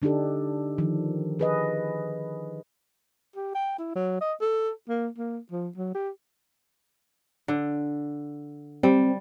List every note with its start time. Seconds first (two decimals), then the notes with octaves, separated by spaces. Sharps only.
0.02 D3 D4 D#4 G4 A4
0.78 D#3 F3
1.39 G#4 B4 D#5
3.36 G4
3.55 G5
3.78 E4
3.95 F#3
4.21 D#5
4.41 A4
4.89 A#3
5.18 A#3
5.52 F3
5.77 F#3
5.95 G4
7.48 D3
8.83 G3 C4